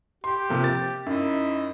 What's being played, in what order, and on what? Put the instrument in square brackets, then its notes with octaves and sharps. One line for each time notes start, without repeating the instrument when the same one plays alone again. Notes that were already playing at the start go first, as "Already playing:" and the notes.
[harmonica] G4 [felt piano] C6
[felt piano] C3 F3 A#3
A6
[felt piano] F#2 [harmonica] D#4 E4